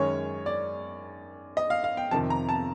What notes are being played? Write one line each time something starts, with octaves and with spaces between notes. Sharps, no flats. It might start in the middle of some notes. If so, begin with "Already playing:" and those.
Already playing: F#2 D#3 G#3 C#4 C#5
D5
D#5
F5
F5
G5
F2 C3 D#3 A5
A#5
A5